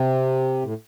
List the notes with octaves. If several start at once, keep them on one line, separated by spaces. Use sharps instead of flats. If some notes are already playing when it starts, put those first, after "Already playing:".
Already playing: C3
A2